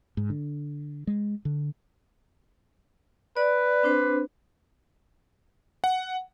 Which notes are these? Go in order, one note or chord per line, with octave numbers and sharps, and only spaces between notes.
G#2
D3
G#3
D3
B4 D5
C4 D4 C5
F#5